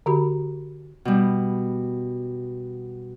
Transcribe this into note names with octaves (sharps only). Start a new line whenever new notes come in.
D3 F#4 G4 B5
B2 G3